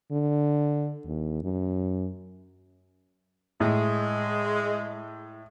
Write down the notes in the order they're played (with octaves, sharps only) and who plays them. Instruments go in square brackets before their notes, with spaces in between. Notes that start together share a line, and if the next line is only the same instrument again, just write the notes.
[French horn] D3
D#2
F#2
[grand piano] A2 [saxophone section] G#3